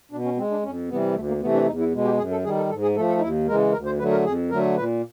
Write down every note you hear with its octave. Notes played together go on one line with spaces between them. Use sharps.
B2 D4
C#4
G#3 C4
D4
F2 C#4
C3 E3 G3 B3
D2 A3
A#3
C3 E3 A3 B3
D4
E2 D#4
E4
B2 G#3
G4
F#2 G#4
A4
D#3 G3 G#4
A4
G#2 A4
G#4
F3 A3 A4
A4
D#4
D#2 E4
C#3 E3 G#3 A#4
D2 A#4
C5
D3 F#3 A3 B4
A#4
F2 G#4
D3 F#3 A3 A#4
A#2 B4